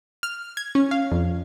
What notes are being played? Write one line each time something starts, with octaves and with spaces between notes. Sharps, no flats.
F6
G#6
C#4
F5
F2